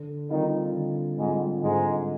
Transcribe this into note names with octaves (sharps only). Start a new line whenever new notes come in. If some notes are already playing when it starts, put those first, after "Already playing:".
Already playing: D3
D#3 G3 C4 D#4 F4
D3
G#2 G3 G#3 C4 F4
G#2 D3 G#3